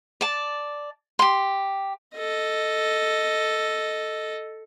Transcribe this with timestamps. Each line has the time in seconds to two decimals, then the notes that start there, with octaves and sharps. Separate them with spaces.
0.21 D5 A5
1.19 G4 C6
2.16 A4 D#5